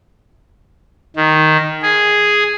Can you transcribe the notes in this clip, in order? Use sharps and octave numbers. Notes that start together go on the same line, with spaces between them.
D#3
G#4